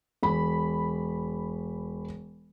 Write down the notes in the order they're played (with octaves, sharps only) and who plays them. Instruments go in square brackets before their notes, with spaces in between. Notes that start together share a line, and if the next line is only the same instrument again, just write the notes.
[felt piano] E1 B5